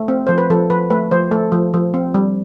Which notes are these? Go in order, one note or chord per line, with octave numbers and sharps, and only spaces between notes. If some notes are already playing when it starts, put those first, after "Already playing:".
Already playing: A3
C4
F3 C5
B4
F3 A4
F3 B4
A3 B4
F3 C5
A3 A4
F3
F3
C4
G3